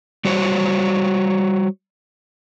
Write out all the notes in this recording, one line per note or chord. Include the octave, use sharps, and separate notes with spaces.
G3 F#4 C5 C#5